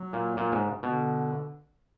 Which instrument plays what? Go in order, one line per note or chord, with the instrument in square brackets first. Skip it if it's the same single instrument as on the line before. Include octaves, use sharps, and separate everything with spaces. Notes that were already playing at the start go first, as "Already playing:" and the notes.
Already playing: [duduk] F#3
[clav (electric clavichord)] A#2
A#2
G#2
[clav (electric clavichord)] B2 [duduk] D3